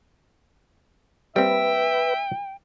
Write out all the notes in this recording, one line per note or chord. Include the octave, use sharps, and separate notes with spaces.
G3 A#3 C4 B4 E5 G5